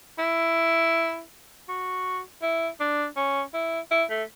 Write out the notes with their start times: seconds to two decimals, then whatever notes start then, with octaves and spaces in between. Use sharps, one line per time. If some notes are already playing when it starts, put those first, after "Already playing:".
0.19 E4
1.68 F#4
2.42 E4
2.80 D4
3.17 C#4
3.54 E4
3.91 E4
4.10 A3